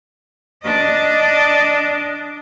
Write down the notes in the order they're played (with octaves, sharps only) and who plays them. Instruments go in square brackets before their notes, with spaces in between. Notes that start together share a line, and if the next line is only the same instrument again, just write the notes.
[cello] D4 D#5